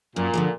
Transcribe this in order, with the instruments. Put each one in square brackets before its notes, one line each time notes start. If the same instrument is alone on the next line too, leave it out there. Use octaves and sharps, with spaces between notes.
[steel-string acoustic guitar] F#2 [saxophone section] A#2
[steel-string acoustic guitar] D3 F3 G#3